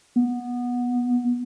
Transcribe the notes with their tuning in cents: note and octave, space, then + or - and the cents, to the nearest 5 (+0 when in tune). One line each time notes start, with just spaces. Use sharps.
B3 -15